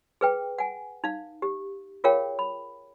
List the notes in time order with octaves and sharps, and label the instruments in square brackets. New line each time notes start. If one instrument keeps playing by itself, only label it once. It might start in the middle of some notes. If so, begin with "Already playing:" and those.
[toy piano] G#4 B4 G5
F#5 G#5
D#4 F5
G4
F4 G#4 A#4 C#5 F5 G5
B5